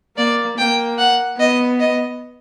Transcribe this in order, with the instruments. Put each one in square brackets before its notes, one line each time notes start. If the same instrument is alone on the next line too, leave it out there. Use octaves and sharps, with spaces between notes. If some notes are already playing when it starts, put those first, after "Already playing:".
[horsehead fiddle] A#3 [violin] D5
[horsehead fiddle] A#3 [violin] G5
[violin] F#5
[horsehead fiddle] B3 [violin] D#5
[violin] D#5